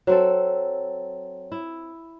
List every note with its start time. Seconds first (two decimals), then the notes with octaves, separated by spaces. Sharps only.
0.07 F#3 C4 A4
1.52 E4